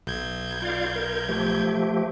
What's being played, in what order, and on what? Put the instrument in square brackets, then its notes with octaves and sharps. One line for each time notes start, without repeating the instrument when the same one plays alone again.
[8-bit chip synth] B1 G6 G#6
[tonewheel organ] F4 D5 F5
A#4
F3 A3 G4